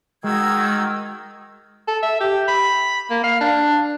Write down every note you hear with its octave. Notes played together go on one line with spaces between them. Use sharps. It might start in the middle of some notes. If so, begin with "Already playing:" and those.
D#3 G#3 F#4 E6 G#6
A4
E5
G4
B5
A#3
F5
D4